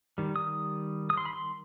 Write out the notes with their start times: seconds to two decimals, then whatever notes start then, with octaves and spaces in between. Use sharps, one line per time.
0.18 D#3 G3
0.36 D#6
1.10 D#6
1.18 C6
1.25 B5
1.33 C6